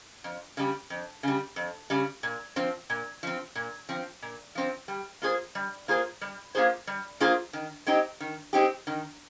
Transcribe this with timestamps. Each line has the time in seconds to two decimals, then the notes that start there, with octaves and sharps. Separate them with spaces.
0.24 F2
0.57 C#3 G3
0.90 F2
1.23 C#3 G3
1.56 F2
1.90 C#3 G3
2.23 A#2
2.56 F3 C4
2.90 A#2
3.23 F3 C4
3.55 A#2
3.89 F3 C4
4.22 A#2
4.55 F3 C4
4.88 G3
5.22 A#3 F4 G#4 C5
5.55 G3
5.88 A#3 F4 G#4 C5
6.21 G3
6.55 A#3 F4 G#4 C5
6.87 G3
7.20 A#3 F4 G#4 C5
7.53 D#3
7.87 G#3 C4 D#4 G4
8.20 D#3
8.53 G#3 C4 D#4 G4
8.87 D#3